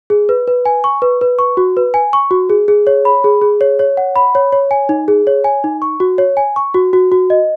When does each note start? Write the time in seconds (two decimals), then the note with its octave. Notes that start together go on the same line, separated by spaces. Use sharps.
0.10 G#4
0.29 B4
0.47 B4
0.65 G#5
0.84 C#6
1.02 B4
1.21 B4
1.39 C#6
1.57 F#4
1.77 B4
1.94 G#5
2.13 C#6
2.31 F#4
2.50 G#4
2.68 G#4
2.87 C#5
3.05 B5
3.24 G#4
3.42 G#4
3.61 C#5
3.79 C#5
3.97 F#5
4.16 B5
4.35 C#5
4.52 C#5
4.71 G#5
4.89 D#4
5.08 G#4
5.27 C#5
5.44 G#5
5.64 D#4
5.82 C#6
6.00 F#4
6.18 C#5
6.37 G#5
6.56 C#6
6.74 F#4
6.93 F#4
7.12 F#4
7.30 D#5